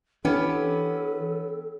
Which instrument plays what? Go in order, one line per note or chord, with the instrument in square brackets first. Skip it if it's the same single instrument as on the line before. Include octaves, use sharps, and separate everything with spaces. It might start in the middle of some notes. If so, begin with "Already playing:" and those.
[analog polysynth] E3 [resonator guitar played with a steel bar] B3 C#4 G4 [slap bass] D4 [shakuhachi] A4